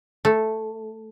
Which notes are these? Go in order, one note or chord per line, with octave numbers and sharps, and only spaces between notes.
A3